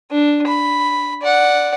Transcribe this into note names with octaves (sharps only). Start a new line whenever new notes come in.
D4
B5
D5 F#5